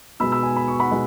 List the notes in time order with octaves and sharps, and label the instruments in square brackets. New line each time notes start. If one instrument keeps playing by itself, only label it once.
[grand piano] B2 G#3 B5 E6
B5 E6
G#5
B5
C#6
F#5 B5
B2 G#3